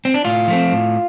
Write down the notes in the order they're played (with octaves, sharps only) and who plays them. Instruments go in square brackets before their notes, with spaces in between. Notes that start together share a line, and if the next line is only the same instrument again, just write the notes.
[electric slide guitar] C4
D4
A2 F4
F3 A3 C4
A2